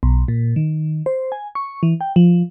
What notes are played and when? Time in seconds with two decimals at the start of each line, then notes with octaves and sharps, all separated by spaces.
0.03 B1
0.28 A#2
0.56 D#3
1.06 C5
1.32 G#5
1.55 C#6
1.83 E3
2.01 G5
2.16 F3